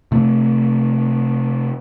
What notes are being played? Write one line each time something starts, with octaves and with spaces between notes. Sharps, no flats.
C3 A3